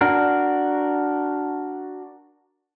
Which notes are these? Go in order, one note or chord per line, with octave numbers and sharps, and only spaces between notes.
D4 F#4 A#4